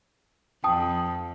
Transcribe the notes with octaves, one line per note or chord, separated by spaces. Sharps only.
F2 G5 A5 D#6